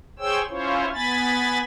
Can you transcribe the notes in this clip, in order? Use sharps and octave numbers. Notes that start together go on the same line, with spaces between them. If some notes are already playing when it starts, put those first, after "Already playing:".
G#4 C5 C#5 G5 E6
C#4 E4 F4 C5 C#5
B3 G#5 B5 A6